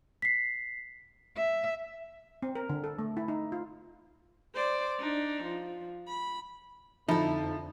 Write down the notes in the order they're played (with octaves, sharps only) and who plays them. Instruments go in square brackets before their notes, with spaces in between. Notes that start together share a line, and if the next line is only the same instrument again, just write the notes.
[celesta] B6 C7
[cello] E5
[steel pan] C4
A#4
D3
A4
A3
E4
D#4
F4
[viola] C5 D5
D4 D#4
F3
B5
[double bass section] F2 D3 [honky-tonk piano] F3 [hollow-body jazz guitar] D#4 A4 [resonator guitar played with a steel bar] E4